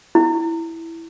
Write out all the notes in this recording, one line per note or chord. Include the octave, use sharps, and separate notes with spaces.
E4